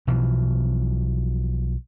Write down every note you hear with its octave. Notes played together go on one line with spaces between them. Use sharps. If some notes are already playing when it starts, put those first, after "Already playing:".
B1 B2 E3 F3